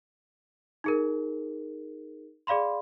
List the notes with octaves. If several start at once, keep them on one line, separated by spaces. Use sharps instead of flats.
D#4 G#4 A#4
G#4 D5 F5 B5 C6